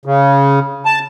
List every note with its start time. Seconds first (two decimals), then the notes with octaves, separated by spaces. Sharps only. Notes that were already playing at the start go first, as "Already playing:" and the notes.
0.05 C#3
0.85 A5